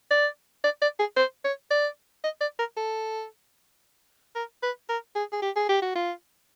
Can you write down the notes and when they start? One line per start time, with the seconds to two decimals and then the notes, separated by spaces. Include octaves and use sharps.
0.11 D5
0.64 D5
0.82 D5
0.99 G#4
1.17 C5
1.44 C#5
1.71 D5
2.24 D#5
2.41 D5
2.59 A#4
2.77 A4
4.35 A#4
4.63 B4
4.89 A#4
5.15 G#4
5.33 G#4
5.42 G4
5.56 G#4
5.69 G4
5.82 F#4
5.95 F4